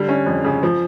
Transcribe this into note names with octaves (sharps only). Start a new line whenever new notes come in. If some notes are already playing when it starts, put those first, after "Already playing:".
Already playing: D3 G3
C#4
F2
C#3
F3